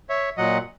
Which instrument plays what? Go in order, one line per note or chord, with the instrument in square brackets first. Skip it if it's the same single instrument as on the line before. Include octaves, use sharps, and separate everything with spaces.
[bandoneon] C#5 E5
A#2 F#3 D#5 F#5